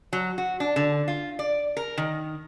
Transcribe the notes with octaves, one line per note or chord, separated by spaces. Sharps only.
F#3
F#4
D4
D3
F4
D5
A#4
D#3